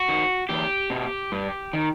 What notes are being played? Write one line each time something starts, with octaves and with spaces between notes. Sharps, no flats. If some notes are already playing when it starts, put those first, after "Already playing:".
Already playing: F#4
D#3
E2 G4
B2
G2
D#3